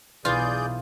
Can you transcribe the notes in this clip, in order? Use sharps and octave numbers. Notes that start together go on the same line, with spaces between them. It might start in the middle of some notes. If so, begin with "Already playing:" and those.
B1 E3 F4 G#4 D5 G#5 G6